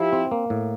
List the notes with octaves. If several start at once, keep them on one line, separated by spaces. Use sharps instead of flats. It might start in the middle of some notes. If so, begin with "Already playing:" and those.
Already playing: F3 E4 G4
C4
A#3
A2